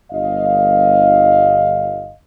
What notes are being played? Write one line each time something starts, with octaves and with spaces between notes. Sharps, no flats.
G1 D#5 F5